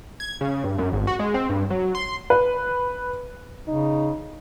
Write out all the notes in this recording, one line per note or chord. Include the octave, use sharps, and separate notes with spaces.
G#6
C#3
G2
F#2
G#1
F#4
G#3
C4
G2
F#3
C6
B4
C#3 D#4